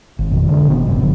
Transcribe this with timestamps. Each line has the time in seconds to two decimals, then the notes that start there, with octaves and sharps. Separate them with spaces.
0.19 G#1
0.31 F2 B2 D#3
0.49 D3 G#3 D4
0.67 F1 B2 D#3 B3
0.86 F1 F#2 A2 C3
0.99 G1 D3 F3